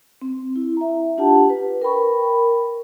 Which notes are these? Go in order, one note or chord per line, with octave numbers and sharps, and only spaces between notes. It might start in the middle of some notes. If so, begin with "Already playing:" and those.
C4
E4
E5 A#5
D4 F4 G4 F#5 A5
B4
A#4 G5 B5 C#6